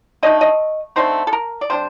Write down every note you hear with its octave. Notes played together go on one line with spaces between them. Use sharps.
D3 A3 D#4 D#5
D#5
D3 A3 C4 D#4 C5
A4
A#4
D5
C3 G3 D4 C5